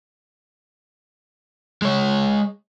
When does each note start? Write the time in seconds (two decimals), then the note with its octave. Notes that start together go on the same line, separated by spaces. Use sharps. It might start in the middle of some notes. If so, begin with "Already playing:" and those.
1.82 G#3 C#5